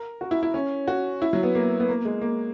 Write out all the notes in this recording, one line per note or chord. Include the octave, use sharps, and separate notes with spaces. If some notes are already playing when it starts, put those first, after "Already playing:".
Already playing: A#4
F#4
E4
E4
C#4
F#4
E4
F#3
B3
A#3
B3
A#3
G#3
A#3